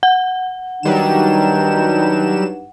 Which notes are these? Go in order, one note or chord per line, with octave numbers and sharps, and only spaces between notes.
F#5
G2 D#3 F#3 G3 D4 D#4 E7